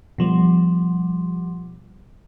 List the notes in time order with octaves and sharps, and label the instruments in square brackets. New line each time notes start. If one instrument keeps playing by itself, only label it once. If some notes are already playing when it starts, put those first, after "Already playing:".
[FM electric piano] B2 F3 G3